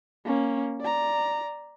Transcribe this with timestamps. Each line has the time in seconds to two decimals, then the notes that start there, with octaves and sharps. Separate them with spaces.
0.25 A#3 C#4
0.80 D5 A#5